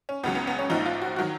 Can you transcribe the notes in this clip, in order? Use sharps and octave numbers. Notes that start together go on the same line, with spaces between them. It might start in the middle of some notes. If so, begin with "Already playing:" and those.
C#4
C#2 C#3 F#3 B3
B3
B3
C#4
A#1 G#2 F3 D#4
F4
F#4
D#3 F#3 F#4